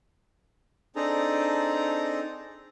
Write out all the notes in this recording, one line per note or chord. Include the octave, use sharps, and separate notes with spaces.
C4 D4 D#4 G#4 A4 A#5